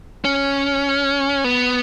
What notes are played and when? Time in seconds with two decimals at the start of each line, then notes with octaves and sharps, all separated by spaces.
0.25 C#4
1.44 B3